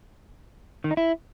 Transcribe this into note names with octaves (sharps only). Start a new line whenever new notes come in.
D#3
D#4
E4